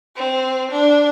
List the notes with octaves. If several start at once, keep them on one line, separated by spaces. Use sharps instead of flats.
C4
D4